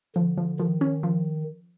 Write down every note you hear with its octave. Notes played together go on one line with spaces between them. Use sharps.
D3 F3
F3
D#3 F3
C#4
F3